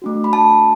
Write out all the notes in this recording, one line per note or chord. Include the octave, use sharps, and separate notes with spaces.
A3 D4 F#4
B5
A5